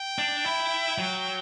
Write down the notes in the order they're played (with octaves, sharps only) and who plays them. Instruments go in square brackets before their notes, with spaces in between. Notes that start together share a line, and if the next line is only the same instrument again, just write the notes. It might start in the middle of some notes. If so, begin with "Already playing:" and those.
Already playing: [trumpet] G5
[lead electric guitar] D4
E4
F#3